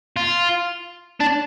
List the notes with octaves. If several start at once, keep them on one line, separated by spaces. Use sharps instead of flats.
F4
D4